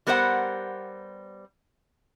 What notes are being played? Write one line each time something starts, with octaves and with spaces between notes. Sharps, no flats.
G3 B3 A#4 C5 C#5 F#5